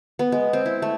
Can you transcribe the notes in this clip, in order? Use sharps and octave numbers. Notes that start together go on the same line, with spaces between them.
B3
G#3
C4
E4
A3